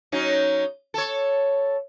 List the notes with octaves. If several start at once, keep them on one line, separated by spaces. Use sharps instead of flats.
F#3 C#4 D#4
A4 C#5